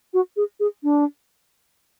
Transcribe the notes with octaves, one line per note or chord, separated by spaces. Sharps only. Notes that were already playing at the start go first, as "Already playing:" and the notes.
F#4
G#4
G#4
D4